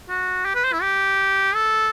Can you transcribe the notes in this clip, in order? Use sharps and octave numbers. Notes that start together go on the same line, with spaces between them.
F#4
G4
B4
C5
E4
G4
A4